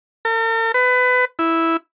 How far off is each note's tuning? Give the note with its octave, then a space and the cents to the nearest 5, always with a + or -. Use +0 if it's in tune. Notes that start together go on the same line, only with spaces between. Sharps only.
A#4 -45
B4 +25
E4 -5